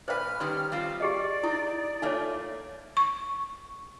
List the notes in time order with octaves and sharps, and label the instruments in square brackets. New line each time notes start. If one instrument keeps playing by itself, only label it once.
[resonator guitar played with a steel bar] A#2 B4 [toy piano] C5 D5 F5 [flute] F6
[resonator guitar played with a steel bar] D#3 G3 C#4 [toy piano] C6
[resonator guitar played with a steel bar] G3 C4 F4 [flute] F5
[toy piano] G4 G#4 D#5 [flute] D5
[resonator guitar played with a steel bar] D#4 [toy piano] E4
[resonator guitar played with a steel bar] A3 A#3 F4 [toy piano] D#4 C#5
[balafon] C#6